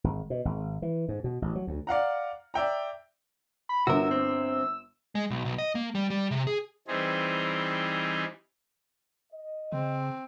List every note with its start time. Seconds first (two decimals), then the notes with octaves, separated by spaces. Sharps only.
0.04 G#1
0.30 B2
0.45 G#1
0.82 E3
1.09 G#2
1.24 B2
1.42 A1
1.56 F#3
1.67 D2
1.87 D5 F5 F#5 A#5
2.54 D5 E5 G5 A#5
3.69 B5
3.87 G1 D3 F#4 A#4 E6
4.11 C4
5.15 G#3
5.30 B1
5.45 B1
5.58 D#5
5.75 A#3
5.95 G3
6.10 G3
6.31 C3
6.47 G#4
6.88 E3 G3 C4 D#4 G#4
9.32 D#5
9.72 C#3 C4